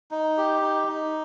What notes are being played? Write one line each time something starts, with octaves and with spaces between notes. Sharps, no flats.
D#4
G4
D#4
D#4